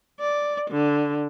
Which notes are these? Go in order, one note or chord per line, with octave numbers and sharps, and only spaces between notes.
D5
D3